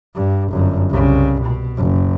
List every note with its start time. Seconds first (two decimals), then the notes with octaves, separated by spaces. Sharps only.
0.15 G2
0.49 G1 F#2
0.90 C2 C#3
1.42 B2
1.77 F#1